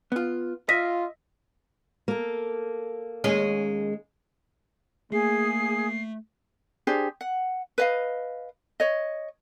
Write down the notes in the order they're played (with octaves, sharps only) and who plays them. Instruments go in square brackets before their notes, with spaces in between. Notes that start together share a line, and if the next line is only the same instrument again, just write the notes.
[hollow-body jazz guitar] B3 F4
[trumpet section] F4 [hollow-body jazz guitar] D#5 E5 [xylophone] A#6 B6
[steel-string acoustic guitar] A#3 A4
[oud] D#2 G#3 C#4
[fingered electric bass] A3 [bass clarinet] A#3 [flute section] G#4 [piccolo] C7
[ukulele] D4 G4 G#4 C5
F#5
B4 D#5 F5
C#5 D#5